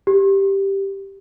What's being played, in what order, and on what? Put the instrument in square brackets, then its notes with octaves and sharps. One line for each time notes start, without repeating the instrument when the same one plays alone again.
[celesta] G4